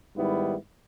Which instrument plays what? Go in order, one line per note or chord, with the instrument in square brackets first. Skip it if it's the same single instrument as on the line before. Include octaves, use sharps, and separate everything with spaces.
[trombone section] G#2 D#3 G3 B3 E4